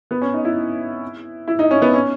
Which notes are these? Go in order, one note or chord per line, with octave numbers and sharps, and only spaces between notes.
B3
C#4
D#4
E4
E4
D#4
C#4
B3
C#4